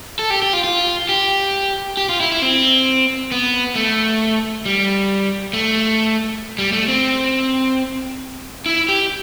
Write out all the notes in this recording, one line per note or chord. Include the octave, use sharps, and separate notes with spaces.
A4
G4
G4
F4
F4
G4
G4
F4
E4
E4
C4
B3
A3
G3
A3
G3
A3
C4
E4
G4